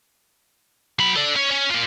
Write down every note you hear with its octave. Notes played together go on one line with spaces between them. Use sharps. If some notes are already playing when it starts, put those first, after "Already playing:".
F#3 B5
A4 D5
C#4 C#5
C#4
A#3 F4